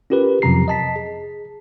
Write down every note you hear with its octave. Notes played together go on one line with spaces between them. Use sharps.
C#4 F4 G4 A#4 B4
F2 C3 F3 F#3 A#5 C7
D#5 A5 B6
G#4